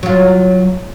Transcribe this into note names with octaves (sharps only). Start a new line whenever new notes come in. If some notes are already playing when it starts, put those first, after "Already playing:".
F#3 F4